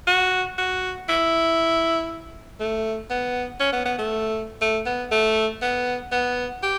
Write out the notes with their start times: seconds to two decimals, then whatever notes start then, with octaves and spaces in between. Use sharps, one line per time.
0.08 F#4
0.58 F#4
1.09 E4
2.60 A3
3.10 B3
3.60 C#4
3.72 B3
3.85 B3
3.98 A3
4.61 A3
4.86 B3
5.11 A3
5.62 B3
6.12 B3
6.63 G4